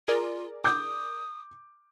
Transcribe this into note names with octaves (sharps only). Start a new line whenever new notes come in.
F4 G#4 A#4 D5
D6 D#6 G6